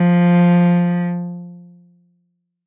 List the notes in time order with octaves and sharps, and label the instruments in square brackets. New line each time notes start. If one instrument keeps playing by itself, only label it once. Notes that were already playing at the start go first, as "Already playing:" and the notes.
Already playing: [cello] F3